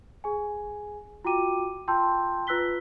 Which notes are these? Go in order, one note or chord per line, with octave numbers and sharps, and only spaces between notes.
G#4 G#5
F4 F#4 G5 D6 D#7
F4 G5 A5 C6 E6 G6
F4 B4 E6 F#6 B6 G7